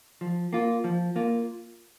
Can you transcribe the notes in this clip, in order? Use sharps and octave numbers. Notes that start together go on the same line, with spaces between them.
F3
A#3 F4
F3
A#3 F4